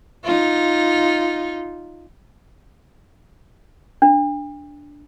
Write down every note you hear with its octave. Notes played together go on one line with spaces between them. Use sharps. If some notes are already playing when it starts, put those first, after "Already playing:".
D#4 F4
D4